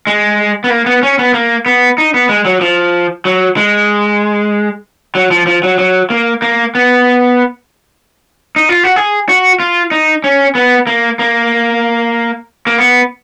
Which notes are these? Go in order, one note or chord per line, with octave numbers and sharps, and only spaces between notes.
G#3
B3
A#3
B3
C#4
B3
A#3
B3
D#4
B3
G#3
F#3
F3
F#3
G#3
F#3
F3
F3
F#3
F#3
A#3
A#3
B3
D#4
F4
F#4
G#4
F#4
F4
D#4
C#4
B3
A#3
A#3
A#3
B3